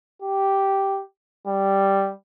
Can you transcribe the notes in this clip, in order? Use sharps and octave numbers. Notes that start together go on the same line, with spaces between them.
G4
G3